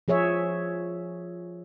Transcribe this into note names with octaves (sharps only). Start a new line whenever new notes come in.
F3 G#4 C#5 E5